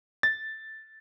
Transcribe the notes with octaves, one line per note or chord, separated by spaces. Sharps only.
A6